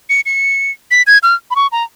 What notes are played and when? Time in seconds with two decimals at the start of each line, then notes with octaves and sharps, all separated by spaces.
0.09 C#7
0.26 C#7
0.91 B6
1.07 G#6
1.23 F6
1.51 B5
1.56 C#6
1.72 A#5